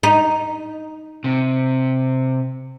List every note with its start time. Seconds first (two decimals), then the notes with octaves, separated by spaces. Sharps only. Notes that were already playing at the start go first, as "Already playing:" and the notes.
0.03 D#4
1.24 C3